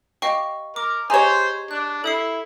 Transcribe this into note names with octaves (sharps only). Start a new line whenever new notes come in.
G4 D#5 F5 C#6
A#4 D6
G4 G#4 C5 C#5 D#5 A#5
D4 F#6
E4 A4 D#6 C7